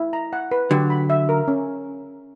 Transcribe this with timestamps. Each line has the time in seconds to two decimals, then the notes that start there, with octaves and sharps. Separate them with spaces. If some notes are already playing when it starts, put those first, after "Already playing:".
Already playing: E4
0.13 A#5
0.33 F#5
0.51 B4
0.71 D3 F#3 G4
0.90 B5
1.10 E5
1.29 A#4
1.48 C#4